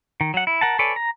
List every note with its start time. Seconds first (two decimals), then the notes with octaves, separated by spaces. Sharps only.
0.21 D#3
0.34 F#3 F#5
0.47 E4
0.61 A#4 F#5 A5
0.79 A4 B4 C#5 D5 G#5
0.96 A#5